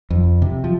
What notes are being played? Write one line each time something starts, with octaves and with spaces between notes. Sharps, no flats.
F2
C3
F3